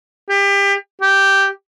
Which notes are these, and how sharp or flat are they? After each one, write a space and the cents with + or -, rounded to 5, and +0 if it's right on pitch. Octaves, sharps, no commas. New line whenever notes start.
G4 +30
G4 -5